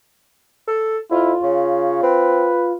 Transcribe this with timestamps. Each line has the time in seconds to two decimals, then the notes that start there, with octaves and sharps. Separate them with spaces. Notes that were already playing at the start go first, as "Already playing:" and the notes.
0.68 A4
1.11 F2 E4 F4
1.43 C#3 C#5
2.03 C4 B4